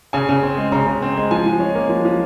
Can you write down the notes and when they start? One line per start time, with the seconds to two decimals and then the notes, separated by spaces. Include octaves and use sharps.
0.13 C#3 G#5
0.29 C#3
0.43 C4
0.58 G#3
0.72 C#3 A#5
0.87 C#3
1.02 C4
1.17 G#3
1.31 F3 G#5
1.46 F3
1.60 C#4
1.75 A#3
1.89 F3
2.05 F3